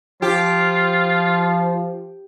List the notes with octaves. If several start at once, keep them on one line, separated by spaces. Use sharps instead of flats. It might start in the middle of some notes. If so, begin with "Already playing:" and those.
F3 F4 G4